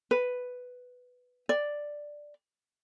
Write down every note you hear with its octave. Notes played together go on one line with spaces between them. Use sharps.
B4
D5